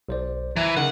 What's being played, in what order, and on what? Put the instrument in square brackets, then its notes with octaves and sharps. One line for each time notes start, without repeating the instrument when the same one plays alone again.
[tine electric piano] B1 C5 D5
[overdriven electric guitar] E3 [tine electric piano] A#5
[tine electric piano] C#3 D#4 A#4 [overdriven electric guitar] F#5